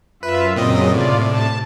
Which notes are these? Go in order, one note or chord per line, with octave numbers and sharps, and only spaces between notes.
F#2 F4 B4 E5
F#2 A#2 C#3 F#3 C4 D#5
A2 C3 F4 D5
A5